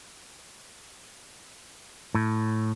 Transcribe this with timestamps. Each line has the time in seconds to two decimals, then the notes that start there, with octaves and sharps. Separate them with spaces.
2.15 A2